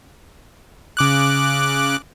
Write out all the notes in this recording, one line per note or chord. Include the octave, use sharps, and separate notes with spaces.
C#3 D6 F#6